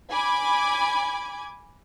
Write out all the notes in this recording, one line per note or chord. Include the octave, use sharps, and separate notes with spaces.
G#5 B5 D6 G#6